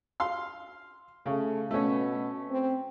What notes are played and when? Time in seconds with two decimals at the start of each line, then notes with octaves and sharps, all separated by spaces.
0.20 F5 C6
1.26 C#3 A3
1.71 B2 A3 C#4
2.50 C4